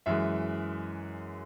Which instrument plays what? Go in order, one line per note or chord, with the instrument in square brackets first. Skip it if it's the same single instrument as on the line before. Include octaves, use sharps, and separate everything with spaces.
[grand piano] F#2 E3 G#3 E5